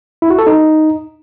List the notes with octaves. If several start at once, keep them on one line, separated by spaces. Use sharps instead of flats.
E4
F#4
A4
D#4